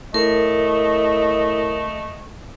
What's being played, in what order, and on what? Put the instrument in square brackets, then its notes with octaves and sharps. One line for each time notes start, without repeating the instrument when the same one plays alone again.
[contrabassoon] A2 [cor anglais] A3 [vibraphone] A#4 [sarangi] D#5